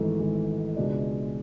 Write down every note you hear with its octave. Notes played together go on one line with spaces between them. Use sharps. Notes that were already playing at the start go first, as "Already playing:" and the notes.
Already playing: G#1 G#2 E3 A3
G#1 G#2 E3 A3
C#2 B2 G#3 D4